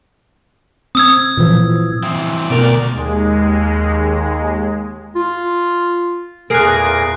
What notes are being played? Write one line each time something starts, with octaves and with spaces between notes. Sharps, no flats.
C4 D#6 E6 G#6
A#2 E3 F3
E3 C4
D2 B2 A#4 D5
D#2 G#3
F4
E2 A#2 G#4 A#4 F#6 A#6 C7 D7